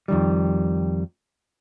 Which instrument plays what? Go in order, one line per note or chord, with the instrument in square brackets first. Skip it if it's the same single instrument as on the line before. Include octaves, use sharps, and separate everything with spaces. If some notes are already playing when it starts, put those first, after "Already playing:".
[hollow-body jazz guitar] F2 D#3 G3